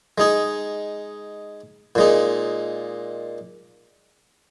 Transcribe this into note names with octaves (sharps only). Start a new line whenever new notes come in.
G#3 D#4 G#4
A#2 G#3 D#4